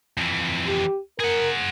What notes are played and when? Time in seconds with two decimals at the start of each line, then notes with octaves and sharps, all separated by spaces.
0.17 F2 E3
0.67 G4
1.20 G#4 A#4 F#5